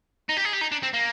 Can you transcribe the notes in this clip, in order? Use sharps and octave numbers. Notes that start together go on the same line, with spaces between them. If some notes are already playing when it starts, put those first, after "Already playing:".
D#4
G4
G#4
G4
D#4
D4
C4
A#3